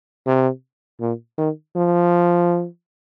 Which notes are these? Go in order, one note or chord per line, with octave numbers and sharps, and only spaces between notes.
C3
A#2
D#3
F3